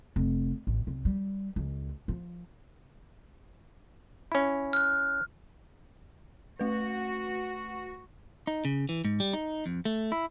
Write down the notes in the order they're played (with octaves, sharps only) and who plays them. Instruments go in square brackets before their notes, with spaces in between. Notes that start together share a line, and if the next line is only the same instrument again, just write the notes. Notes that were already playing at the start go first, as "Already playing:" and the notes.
[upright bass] F1
A1
C2
G3
C#2
F3
[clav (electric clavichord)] C#4 E4
[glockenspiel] F6 F#6
[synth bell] A3 B4 [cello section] F#4
[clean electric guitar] D#4
C#3
E3
G#2
G3
D#4
F2
A3
E4